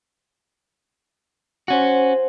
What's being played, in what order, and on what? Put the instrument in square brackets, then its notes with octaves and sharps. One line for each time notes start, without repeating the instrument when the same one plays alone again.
[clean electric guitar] C#4 F#4 [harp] C5 F#5